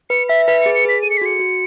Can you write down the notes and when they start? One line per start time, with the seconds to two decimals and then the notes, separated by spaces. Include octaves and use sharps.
0.10 B4 C#7
0.29 E5 B6
0.47 B4 B6
0.61 C#7
0.66 G#4
0.75 C#7
0.85 G#4 B6
1.02 A4 D#7
1.10 C#7
1.17 B6
1.22 F#4 C#7
1.39 F#4